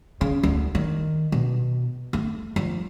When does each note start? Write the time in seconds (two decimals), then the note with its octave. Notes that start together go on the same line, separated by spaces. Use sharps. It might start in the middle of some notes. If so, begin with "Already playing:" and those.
0.21 C#3
0.43 D2
0.75 D#3
1.32 B2
2.13 A3
2.56 F3